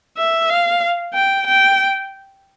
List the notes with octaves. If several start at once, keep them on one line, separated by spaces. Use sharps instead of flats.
E5
F5
G5
G5